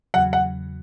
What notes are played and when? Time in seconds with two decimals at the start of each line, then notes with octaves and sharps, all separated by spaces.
0.14 E2 C#3 F#3 F#5
0.33 F#5